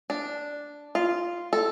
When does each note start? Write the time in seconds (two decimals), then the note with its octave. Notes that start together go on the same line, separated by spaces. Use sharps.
0.10 D4
0.95 F4
1.53 A4